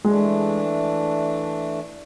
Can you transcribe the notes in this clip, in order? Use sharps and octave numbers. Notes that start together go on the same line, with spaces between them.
E3 G#3 A3 D4